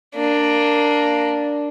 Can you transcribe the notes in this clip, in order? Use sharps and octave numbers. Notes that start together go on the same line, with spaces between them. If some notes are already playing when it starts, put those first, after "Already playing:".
A#3 D4